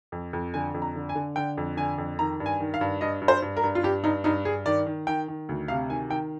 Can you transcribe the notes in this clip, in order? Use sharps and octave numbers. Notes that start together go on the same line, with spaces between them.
F2
F2
D3 G#5
F2
A#5
D3
G#5
D3
D3 G5
F2
D3 G#5
F2
D#3 A#5
G2
G#5
D#3
F5
G2
G2 D#5
G2
C5
G2
A#4
G2
F4
G2 G4
G2 D#4
G2 D#4
G2 G#4
D#3 D5
D#3
D#3 G5
D#3
D2
C3 F5
D#3 G#5
D#3 G5